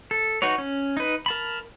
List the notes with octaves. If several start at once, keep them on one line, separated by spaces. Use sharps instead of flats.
A4
D#4 F#4 B4 C#5
C#4
D#4 B4
A#4 A5 B5